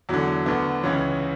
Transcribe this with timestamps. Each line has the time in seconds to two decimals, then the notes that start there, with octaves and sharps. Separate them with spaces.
0.09 E2 D3 F#3
0.46 D2 D3 B3
0.83 C#2 C#3 E3 C#4